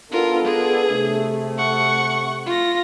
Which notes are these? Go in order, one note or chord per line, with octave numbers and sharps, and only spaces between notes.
B3 D4 F4 A4 A#4
G#4
C3 A3
F#5 C#6
F4 A#6